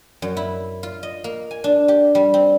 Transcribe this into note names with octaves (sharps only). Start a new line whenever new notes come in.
F#2
E4
F4
D#5
A#3
G#5
D4
G4
G3
C4